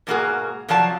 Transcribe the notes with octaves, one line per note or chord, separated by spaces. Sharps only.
G#2 B2 A#3 C#4 F#4 G#4
C3 F3 F#3 D5 F5 A5